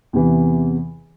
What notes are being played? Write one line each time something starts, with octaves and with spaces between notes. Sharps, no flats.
E2 C3 E3